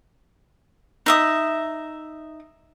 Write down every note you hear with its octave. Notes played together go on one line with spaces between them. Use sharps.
D#4 E5 D#6